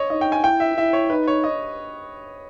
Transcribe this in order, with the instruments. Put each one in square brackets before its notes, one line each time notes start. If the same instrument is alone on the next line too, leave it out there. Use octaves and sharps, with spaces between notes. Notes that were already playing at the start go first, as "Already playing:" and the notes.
Already playing: [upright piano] C#5 D#5
[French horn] D#4 [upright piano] D#5
[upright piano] G5
G#5
[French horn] E4 [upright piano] G5
[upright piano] E5
[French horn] E4 [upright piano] E5
[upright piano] C#5
[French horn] D#4 [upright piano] B4
[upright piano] C#5
D#5